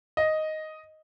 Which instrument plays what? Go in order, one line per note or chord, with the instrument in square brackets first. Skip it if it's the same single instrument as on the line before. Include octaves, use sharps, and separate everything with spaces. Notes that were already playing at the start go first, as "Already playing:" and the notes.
[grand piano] D#5